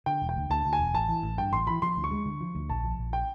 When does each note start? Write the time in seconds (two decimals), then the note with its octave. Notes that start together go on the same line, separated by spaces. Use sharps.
0.06 D3 G5
0.22 E1
0.29 G5
0.37 D2
0.50 D2 A5
0.66 D2
0.73 G#5
0.79 E1
0.94 A1 A5
1.09 E3
1.23 A1
1.38 G2 G5
1.52 A1 C6
1.67 E3 B5
1.82 F3 C6
1.97 D2
2.04 C#6
2.11 G#3
2.26 D3
2.41 F3
2.55 D2
2.69 A#1 A5
2.84 F3
2.99 A#1
3.13 G5